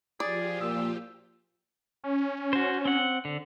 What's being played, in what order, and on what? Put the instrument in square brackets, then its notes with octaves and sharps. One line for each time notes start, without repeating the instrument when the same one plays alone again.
[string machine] F3 F4 G4 [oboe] G#4 [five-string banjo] D5
[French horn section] A#2 [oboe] E6
[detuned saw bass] C#4
[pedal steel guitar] F#4 C5
C4 F#5
D3